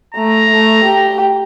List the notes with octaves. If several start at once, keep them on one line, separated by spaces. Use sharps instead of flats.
A3 A#5
A3
G4